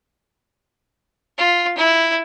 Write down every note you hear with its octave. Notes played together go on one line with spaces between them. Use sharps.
F4
E4